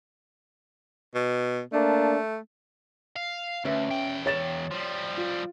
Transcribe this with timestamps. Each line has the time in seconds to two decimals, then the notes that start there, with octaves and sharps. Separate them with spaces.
1.15 B2
1.73 A3 A#3 D4
3.16 F5
3.65 D2 C#4 B4 E5
3.90 E2 G5
4.26 C#5 A6 E7
4.71 F3 G3
5.18 F4